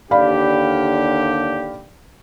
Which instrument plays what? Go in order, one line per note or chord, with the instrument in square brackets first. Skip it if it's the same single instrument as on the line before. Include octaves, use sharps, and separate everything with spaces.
[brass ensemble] D#2 D3 G4 [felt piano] D5 F5 B5